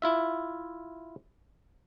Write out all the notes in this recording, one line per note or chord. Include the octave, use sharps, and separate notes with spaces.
E4 F4 E5